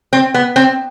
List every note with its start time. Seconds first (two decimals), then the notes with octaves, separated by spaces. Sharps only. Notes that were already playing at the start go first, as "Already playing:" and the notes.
0.13 C4
0.34 B3
0.56 C4